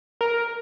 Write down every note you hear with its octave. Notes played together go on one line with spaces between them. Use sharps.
A#4